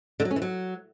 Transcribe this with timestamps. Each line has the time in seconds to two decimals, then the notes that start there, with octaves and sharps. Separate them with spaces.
0.20 D3
0.25 F#3
0.31 C#4
0.36 E3
0.42 F#3